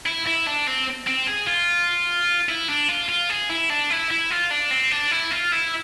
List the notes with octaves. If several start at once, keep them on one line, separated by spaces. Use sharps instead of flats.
E4
E4
D4
C4
C4
G#4
F4
E4
D4
F4
F4
G#4
E4
D4
E4
E4
F4
D4
C4
D4
E4
F4
E4